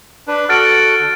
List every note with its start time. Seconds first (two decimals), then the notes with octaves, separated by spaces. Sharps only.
0.28 D4 B4
0.49 F#4 A4 F#5 F6 A6 D7
1.00 D3